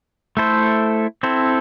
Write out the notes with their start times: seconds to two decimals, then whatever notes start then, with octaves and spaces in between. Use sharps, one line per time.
0.37 A3 E4 A4 C5
1.23 C4 E4 A4 C5